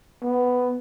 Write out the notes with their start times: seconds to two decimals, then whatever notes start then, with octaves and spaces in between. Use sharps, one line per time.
0.23 B3